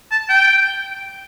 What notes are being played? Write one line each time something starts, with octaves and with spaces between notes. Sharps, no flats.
A5
G5